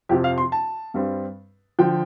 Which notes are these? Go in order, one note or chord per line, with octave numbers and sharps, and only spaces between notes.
F2 C3 F3 G4
F5
C6
A5
G2 G3 C4
D3 F3 G5